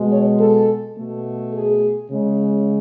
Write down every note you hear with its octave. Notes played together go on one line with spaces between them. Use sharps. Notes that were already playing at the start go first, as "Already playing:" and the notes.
Already playing: B2 G#3
C#5
A4
B2 A3
G#4
C#3 G#3